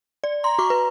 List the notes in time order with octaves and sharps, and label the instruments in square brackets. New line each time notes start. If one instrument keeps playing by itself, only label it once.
[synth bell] D5
[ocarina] A#5 [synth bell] C6
[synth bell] F#4 C#6 D6
B4